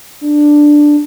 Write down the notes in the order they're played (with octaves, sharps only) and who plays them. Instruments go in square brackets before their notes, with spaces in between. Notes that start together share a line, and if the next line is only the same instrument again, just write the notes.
[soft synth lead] D4